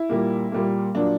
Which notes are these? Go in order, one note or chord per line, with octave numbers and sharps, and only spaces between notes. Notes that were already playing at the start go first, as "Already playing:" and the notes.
Already playing: E4
A#2 G3 A#3
A#2 G3 A#3
A#2 F#3 A#3 D4